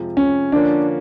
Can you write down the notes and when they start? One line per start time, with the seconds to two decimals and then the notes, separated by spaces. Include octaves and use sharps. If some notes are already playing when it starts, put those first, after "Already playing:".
Already playing: F2 C3 F3 G#3
0.17 C#4
0.52 D3 F3 A#3 C#4 D4